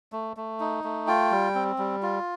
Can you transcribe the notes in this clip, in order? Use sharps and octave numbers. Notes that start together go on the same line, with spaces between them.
A3
A3
D#4
A3
F4 G5
G3
C4
G3
F4